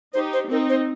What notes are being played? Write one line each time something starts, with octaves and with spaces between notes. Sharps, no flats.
D#4 G4 C5
C5
C4 D#4 A#4
C5